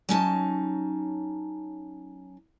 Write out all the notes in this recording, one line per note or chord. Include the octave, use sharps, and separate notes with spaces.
F#3 C#4 D#4 A5